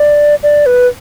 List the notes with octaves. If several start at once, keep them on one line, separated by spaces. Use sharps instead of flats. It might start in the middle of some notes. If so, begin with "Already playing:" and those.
Already playing: D5
D5
B4